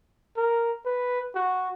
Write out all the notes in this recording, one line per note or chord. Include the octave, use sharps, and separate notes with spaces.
A#4
B4
F#4